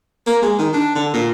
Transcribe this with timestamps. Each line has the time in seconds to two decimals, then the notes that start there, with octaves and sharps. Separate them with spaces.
0.27 A#3
0.42 G#3
0.59 D#3
0.73 D4
0.95 D3
1.14 A#2